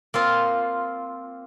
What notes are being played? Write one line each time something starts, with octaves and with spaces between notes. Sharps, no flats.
A#3 C4 F4